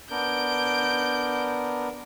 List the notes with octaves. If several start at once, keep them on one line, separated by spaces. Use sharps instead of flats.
B3 D4 A#4 G6 D7